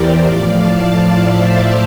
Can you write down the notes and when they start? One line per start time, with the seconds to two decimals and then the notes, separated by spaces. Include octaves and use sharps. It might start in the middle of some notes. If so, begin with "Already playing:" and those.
Already playing: E2 E3 G4 A#4 C5 D5
0.23 A2 F3 D5 F5
0.57 F5 A5
0.90 D5 F5
1.25 C5 E5